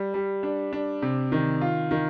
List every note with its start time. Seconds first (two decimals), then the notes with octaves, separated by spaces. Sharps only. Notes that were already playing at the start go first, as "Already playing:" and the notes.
Already playing: G3
0.14 G3
0.43 D4
0.73 D4
1.02 C3
1.32 D#3
1.61 F4
1.91 D#3